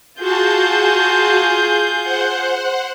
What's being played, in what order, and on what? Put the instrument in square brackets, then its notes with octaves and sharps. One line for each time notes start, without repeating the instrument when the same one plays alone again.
[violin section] F4 G#4 G6 [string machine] F#4 A5
[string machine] C5 F#5